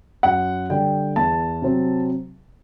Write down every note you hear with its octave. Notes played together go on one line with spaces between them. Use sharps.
F#2 F#5
D3 G3 G5
E2 A5
C3 F#3 C4